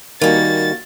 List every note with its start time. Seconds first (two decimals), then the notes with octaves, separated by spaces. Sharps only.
0.21 D#3 G3 A#3 F#4 G#5 A6